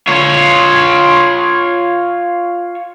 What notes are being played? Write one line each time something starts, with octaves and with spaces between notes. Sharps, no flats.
F4 C#5